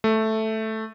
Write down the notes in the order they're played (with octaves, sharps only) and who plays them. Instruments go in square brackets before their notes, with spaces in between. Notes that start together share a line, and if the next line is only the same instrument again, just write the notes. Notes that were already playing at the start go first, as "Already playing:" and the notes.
[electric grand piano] A3